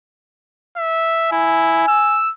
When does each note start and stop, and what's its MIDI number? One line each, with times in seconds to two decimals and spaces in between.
0.77 1.29 76
1.32 1.86 64
1.32 2.18 80
1.88 2.31 88